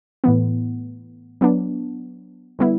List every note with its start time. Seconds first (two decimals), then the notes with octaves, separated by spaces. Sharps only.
0.24 A2 E3 B3
1.41 F#3 B3 D4
2.59 D3 G3 B3 E4